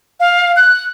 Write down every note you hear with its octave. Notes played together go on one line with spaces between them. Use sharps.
F5
F#6